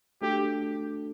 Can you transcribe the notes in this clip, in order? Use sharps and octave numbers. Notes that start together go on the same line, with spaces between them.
A3 D4 F#4 G4 A4